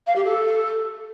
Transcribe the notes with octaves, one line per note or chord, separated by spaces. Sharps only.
F5
G4
A4